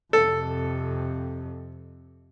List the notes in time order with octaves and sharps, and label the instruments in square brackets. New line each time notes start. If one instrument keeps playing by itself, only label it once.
[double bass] F2 C3 [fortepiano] A4